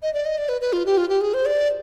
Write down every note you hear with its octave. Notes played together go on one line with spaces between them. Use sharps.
D#5
D5
D#5
D5
B4
B4
F4
G4
F4
G4
G#4
C5
D5